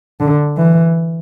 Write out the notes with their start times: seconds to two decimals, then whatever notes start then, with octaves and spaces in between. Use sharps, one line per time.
0.20 D3
0.57 E3